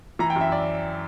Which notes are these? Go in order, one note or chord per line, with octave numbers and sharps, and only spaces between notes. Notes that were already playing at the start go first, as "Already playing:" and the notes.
E3 A#5
G5
F#2
E5
D5